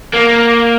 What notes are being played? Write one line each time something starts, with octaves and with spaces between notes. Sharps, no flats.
A#3